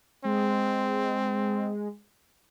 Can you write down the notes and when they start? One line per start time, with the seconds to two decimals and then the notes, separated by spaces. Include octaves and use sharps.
0.25 G#3 C4